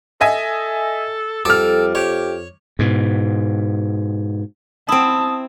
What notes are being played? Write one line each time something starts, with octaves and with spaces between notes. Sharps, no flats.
A4 D#5 E5 G#5
F2 G3 A4 D6 F6
G4 C#5
G#2 B2
C4 E4 A5 D#6